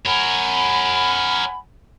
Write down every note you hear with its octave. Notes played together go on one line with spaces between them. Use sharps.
A#4 C#5 F#5 G#5 B5